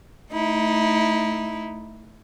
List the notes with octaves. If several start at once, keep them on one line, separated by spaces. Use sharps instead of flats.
A3 D#4 E4